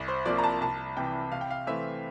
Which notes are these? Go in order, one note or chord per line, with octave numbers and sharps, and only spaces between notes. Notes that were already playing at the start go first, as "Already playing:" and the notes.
Already playing: C2
C5
C3 F3 A#3 D5
A#5
A5
C2 A5
C3 E3 G5
C3 F5
G5
F5
E3 A3 C4 E5